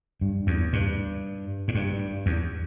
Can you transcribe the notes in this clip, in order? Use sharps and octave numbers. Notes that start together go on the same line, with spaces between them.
G2
E2
G2
G#2
G2
E2